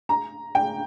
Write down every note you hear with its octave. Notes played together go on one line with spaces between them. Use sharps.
A#5
G5